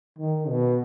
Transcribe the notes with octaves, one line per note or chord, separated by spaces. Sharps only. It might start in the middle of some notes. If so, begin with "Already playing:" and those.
D#3
B2